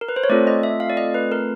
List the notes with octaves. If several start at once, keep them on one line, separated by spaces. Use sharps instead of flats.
A#4
B4
C5
C#5
A3 C4 F4 A4 D5
D#5
E5
F5
D5
D#5
B4
A#4